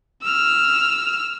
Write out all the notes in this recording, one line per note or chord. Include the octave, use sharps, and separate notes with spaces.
E6 F6